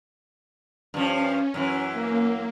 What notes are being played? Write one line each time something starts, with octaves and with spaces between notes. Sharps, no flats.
G2 F3 C#4
F#2 D#3 E3
A#3